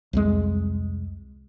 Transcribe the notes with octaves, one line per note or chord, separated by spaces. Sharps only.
C2 F2 G#3